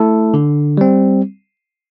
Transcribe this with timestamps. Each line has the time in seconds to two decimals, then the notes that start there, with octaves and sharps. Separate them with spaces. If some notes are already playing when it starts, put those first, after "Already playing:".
Already playing: A3 E4 A4
0.34 D3
0.77 G3 C4